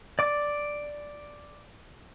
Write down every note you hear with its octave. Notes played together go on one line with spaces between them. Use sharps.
D5 D6